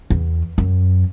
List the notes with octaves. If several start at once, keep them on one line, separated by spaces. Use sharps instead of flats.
E2
F#2